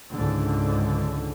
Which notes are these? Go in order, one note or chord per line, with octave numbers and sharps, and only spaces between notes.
C#2 G#2 D3